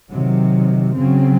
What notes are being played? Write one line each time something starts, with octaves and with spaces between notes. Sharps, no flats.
C3 D#3 F#3
C#3 F#3 C4